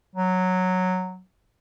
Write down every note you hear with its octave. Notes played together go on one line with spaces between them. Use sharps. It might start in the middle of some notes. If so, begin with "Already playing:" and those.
F#3